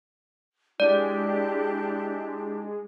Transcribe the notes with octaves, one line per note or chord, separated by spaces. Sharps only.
G#3 D4 E4 G4 D5